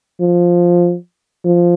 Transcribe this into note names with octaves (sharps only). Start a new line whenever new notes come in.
F3
F3